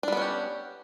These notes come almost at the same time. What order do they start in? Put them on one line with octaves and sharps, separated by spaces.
D4 G3 B3 C#4 G4